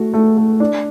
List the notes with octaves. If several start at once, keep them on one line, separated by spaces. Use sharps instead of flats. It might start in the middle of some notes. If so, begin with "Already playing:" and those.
Already playing: A3 F#4
A3
A3
D4